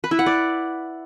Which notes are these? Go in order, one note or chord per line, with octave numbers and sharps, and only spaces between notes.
B4
E4
F#5
D5